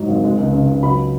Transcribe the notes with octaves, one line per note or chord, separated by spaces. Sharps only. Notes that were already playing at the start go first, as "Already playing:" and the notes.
Already playing: G#2 F#3
G#1
G#3
C#2
C#3
C#2
F#3 B5